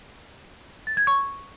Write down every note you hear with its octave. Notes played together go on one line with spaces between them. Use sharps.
A6
G#6
C#6